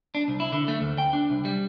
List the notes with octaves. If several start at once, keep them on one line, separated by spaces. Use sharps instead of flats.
D4
C2
E4
D3
A3
D2
G5
D4
C2
G3